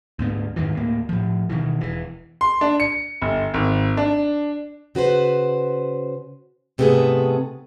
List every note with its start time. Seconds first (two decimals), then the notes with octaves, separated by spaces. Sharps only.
0.19 D2 G#2 B3
0.56 F2 G#2 D#3 E3
0.73 D1 A2 A#3
1.09 A2 F3
1.49 B2 D#3 E3
1.81 E1 A#1 E3
2.41 C6
2.61 D4
2.80 C#7
3.22 G1
3.54 G#1
3.97 D4
4.95 C#3 F#4 B4 C5
6.78 G#2 C3 A3 B3 G#4 A4